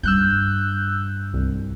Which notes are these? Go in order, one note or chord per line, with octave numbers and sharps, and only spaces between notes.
G2 E6 F#6 G6
C2